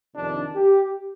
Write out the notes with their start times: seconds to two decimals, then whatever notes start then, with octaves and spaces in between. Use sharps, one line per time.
0.16 F2 C3 D#3 D4
0.55 G4